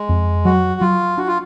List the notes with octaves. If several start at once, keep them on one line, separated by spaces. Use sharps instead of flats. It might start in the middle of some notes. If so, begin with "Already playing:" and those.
Already playing: G#3
F2
F#3 F#4
F#3 F4
D4 F#4
F4